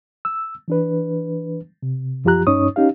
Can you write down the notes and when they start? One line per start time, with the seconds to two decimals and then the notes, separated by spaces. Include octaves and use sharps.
0.25 E6
0.68 E3 D4 B4
1.83 C3
2.25 F#2 F3 F4 G4 A#5 F#6
2.47 G2 C#4 D#4 C#5 C#6 D#6
2.76 C#4 D#4 G4 F5